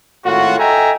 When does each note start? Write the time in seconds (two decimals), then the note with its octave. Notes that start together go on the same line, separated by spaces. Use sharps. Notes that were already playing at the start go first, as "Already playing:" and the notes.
0.25 G#1 A2 F4 F#4
0.58 A4 D#5 E5 G5 G#5 A#5